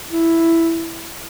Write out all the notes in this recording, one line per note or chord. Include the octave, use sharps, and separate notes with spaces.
E4